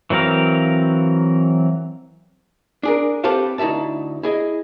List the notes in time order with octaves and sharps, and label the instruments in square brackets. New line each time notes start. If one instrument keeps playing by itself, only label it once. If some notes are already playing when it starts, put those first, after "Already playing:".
[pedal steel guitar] E3 F#3 C4 A#4 F5
[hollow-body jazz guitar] D4 G#4 A#4
C4 G4 A4 B4 C5 F5
D2 D#4 E4 E5 A5
E4 G#4 D#5